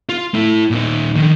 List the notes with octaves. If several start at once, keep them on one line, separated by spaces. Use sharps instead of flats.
F4
A3 E4
A#2 D#4
D3 D#3